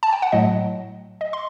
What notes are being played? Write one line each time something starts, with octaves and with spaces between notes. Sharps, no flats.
A5
G5
F#5
A2 F#3 A3 D#5
D#5
C6